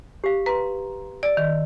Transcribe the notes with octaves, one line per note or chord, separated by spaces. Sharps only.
G4 F5
B4 A#5 C6
D5 E6
D#3